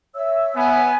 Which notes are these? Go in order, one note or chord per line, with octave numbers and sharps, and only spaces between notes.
C#5 E5 E6
B3 G#5